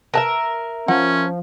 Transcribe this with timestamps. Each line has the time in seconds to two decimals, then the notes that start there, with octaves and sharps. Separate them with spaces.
0.14 A#4 B4 E5 A5
0.88 F3 C#4 F#5